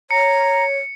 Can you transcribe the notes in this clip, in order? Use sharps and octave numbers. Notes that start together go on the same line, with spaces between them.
C#5 A#5 C#7